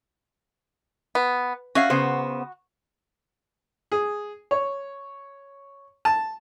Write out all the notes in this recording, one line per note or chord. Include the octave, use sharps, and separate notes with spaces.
B3
C#4 F#4 E5 F5
C#3 B3 C5
G#4
C#5
A5